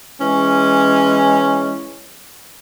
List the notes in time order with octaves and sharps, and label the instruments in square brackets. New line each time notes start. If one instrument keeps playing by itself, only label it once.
[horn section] E3 G#3 C#4